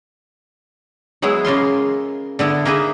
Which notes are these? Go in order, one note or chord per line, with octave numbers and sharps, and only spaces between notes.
F#3 G#3 B3 E4 G#4
C#3 A#3 F4 C6
D3 B3 E4
A#3 D#4 G#4 B4 E5